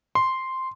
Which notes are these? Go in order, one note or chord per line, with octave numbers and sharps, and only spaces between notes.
C6